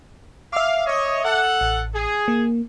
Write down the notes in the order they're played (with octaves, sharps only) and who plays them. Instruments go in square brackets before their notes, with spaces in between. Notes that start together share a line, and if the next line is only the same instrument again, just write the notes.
[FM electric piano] E5 D6 [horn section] F5
[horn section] C#5 D#5
A4 F#5
[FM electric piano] A1
[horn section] G#4
[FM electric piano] A#3